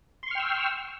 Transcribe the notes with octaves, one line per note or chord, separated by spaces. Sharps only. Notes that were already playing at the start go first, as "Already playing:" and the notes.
G5 C6 C#6 E6 F6